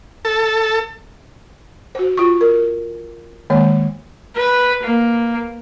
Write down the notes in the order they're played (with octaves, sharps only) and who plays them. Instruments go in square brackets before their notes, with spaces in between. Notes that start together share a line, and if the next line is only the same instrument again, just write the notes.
[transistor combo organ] A4
[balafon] F#4 C5
F4 C#6
A#4
D#3 G#3 A#3 C#5
[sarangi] B4
A#3